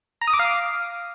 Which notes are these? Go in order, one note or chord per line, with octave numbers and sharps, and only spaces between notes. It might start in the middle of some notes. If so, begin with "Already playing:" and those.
A#5
D#6
D6
F5